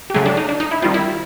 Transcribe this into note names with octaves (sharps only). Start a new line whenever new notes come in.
G4
C#3 F#3 A3 G#4
D4
D#4
D4
D#4
E4
D#3 G3 C4 F4
E4